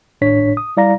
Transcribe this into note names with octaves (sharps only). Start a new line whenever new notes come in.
G#1 A2 D4 C#5 B6
D#6
G3 E4 D5 F5 A#5 A#6